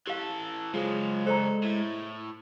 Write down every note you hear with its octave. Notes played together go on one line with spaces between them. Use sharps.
E3 G4 A4 F5
C#3 F3 F#3 G#3
A4 C5 D5 A#5
A2 E4